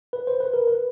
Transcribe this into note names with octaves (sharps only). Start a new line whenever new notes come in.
B4
C5
B4
A#4
B4